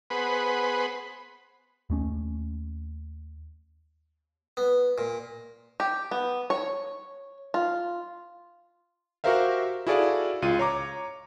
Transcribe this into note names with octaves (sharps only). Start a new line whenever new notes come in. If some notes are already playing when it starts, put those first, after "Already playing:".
B3 G#4 B4 C5 F#5 B5
D#2 A3 C#4
B3
A#2
G4
B3
C#5
F4
F#4 G4 A#4 C5 E5 F5
E4 F#4 G#4 A4 D5 F5
C#2 F4 D#7
C#5 A#5 D6